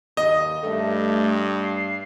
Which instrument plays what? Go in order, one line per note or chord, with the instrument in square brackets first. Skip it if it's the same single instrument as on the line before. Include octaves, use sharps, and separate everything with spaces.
[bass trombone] D#2 [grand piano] D#5
[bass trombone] G2 [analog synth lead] A3
[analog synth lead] C7